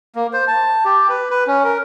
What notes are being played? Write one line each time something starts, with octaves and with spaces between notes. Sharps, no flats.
A#3
C5
A5
G4
B4
B4
C#4
A#4